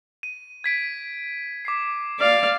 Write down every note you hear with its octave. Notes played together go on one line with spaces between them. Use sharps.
D#7
G#6 B6 D7
D6 B6 C7
D5 F5